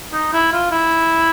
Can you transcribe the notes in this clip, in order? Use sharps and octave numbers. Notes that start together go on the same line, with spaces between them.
D#4
E4
F4
E4